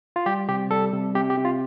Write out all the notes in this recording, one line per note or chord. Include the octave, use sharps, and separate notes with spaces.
F4
G3 G4
C3 G4
G3 A4
C3
C3 G4
G4
C3
F4